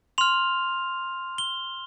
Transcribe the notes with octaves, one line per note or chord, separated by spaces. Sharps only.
C6 F6 F7
G7